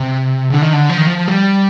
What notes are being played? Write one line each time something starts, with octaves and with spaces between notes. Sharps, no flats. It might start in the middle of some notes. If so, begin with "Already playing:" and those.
Already playing: C3
D3
D#3
D3
F3
D#3
F3
G3